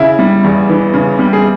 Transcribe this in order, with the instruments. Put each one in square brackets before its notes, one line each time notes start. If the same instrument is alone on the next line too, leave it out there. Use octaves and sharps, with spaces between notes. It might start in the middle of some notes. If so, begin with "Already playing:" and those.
Already playing: [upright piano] C#3 E4
G3
E2
E3
C#3
G3
G#4